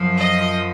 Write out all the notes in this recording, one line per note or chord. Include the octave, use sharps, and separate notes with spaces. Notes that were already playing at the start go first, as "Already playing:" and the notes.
Already playing: F#2 F3
D#5